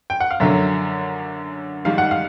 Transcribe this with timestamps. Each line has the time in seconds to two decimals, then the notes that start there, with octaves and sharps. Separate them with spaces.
0.10 G5
0.20 F#5
0.31 F5
0.40 F#2 D3 F#3 E5
1.85 G#2 D#3 G3 F5
1.98 F#5
2.11 F5